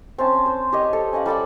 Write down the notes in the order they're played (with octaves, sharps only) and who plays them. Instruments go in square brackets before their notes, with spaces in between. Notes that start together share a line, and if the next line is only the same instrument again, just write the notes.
[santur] C4 C#4 A5
C5
G4 C#5 D#5
A4
C#4 D#5 F5 F#5
G3 A4 D5 G5